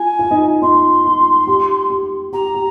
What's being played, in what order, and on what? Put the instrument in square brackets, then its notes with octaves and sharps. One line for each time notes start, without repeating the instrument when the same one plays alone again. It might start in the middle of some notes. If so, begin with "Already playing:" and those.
Already playing: [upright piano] F4 [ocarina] G#5
[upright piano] F4
D#4
F4
[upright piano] D#4 [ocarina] C6
[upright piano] F4
G4
G4
[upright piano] G4 [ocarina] A#5
[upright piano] G4